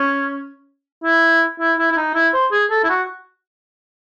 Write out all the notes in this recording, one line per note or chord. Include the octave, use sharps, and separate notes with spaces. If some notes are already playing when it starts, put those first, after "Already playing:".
Already playing: C#4
E4
E4
E4
E4
D#4
E4
C5
G#4
A4
E4
F#4